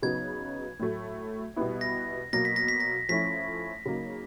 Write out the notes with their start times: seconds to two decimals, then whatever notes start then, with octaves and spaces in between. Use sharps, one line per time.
0.02 C#3 F#3 B3 D#4 G#6
0.80 A2 F#3 A3
1.56 B2 G3 B3 E4
1.81 A#6
2.33 B2 F#3 A#3 A#6
2.45 B6
2.56 A#6
2.68 B6
2.80 A#6
3.09 F3 A3 C#4 E4 B6
3.86 C#3 F#3 A#3 D#4